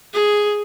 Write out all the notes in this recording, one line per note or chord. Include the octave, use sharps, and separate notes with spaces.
G#4